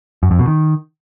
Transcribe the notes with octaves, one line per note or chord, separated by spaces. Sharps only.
F#2
F2
B2
D#3